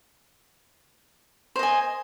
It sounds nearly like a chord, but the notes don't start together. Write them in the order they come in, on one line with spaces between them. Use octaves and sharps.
C5 D#5 G#5